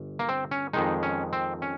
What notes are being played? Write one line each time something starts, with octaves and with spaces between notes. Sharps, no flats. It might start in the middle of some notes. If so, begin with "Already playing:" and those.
Already playing: G1
A#3
C4
C#4
F2 D#3 G#3 D#4
C#4
C4
C#4